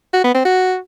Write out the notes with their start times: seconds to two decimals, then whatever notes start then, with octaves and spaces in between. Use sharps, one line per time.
0.13 F#4
0.24 B3
0.35 C4
0.45 F#4